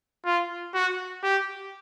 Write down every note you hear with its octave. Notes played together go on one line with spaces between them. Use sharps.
F4
F#4
G4